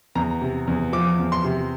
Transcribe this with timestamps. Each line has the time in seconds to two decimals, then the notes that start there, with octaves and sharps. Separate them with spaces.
0.15 E2 A#5
0.41 C3
0.67 E2
0.93 F3 D6
1.19 E2
1.32 C6
1.44 C3